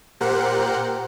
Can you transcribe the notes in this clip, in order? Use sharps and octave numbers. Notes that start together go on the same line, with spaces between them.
A#2 G4 A#4 C5 F#5 F#6